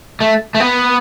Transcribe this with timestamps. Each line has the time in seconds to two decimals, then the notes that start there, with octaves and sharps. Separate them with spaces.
0.20 A3
0.55 A3
0.60 B3